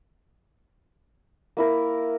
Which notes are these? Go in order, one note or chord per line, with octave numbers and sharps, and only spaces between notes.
A#3 E4 A#4